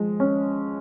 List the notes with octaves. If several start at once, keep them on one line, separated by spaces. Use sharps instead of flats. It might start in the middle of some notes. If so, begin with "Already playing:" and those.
Already playing: F3 G#3
C#4